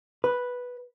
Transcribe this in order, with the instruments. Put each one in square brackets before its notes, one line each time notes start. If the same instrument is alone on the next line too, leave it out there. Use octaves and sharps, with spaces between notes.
[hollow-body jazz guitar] B4